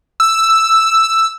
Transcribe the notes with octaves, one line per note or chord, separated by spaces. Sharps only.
E6